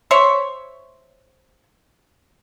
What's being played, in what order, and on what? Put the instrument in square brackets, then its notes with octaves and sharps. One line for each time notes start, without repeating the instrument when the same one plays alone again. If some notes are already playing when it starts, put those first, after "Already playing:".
[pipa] C5 C#5 E5